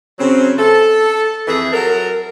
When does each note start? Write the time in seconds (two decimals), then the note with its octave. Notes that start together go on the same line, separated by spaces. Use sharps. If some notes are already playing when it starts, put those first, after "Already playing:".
0.19 C#3 F#3 C4
0.59 A4
1.48 F2 E3 G#4 E5
1.73 F#3 A4 A#4